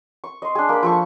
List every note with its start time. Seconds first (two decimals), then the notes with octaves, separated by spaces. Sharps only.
0.24 C#6
0.42 D#5 C6
0.55 D4 G#4
0.69 A#3 B5
0.83 F3 A4 C#6